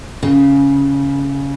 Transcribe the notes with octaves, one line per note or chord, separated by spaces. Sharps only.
C#3